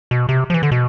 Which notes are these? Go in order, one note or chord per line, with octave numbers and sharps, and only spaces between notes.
B2
C3
F3
E3
D3
B2